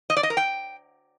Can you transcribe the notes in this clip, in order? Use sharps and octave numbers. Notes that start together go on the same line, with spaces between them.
D#5
D5
D#5
A#4
G5